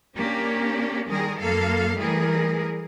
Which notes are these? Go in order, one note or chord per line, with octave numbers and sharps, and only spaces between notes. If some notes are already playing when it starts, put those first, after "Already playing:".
A#3 C#4 D4 G4
D#3 G3 G#4 A#4
F#2 A#3 A4 F5
E3 G3 A3 G#4 A#4